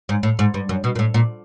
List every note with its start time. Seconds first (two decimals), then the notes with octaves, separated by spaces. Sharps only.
0.09 G#2
0.23 A2
0.39 G#2
0.54 G2
0.69 F#2
0.84 B2
0.95 A#2
0.99 A2
1.14 A#2